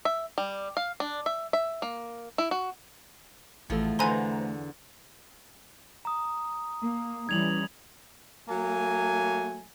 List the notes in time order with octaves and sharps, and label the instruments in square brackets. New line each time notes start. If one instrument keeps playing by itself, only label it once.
[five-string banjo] E5
G3
F5
D4
E5
E5
A#3
E4
F#4
[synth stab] A1 A4 [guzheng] E2 F3 [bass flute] A3
[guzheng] E2 D3 [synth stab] B4 C5 A#5 [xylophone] G#5 C6
[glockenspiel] A#5 D#6
[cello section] A#3
[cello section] E3 G3 C#4 [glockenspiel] G#6 F7 F#7
[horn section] F#3 A3 A#3 G#5